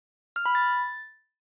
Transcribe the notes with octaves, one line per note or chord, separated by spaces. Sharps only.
F6
B5
A6